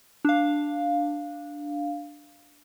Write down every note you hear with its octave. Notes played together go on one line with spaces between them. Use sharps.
D4 F5